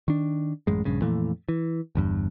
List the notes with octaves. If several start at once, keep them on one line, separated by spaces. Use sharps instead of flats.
D#3 D4
A1 F#2 G#3
A#1 G2 C#3
F2 A#2 E3 A3
E3
G1 E2 G2